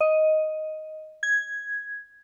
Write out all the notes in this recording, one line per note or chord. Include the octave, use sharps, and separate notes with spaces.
D#5
G#6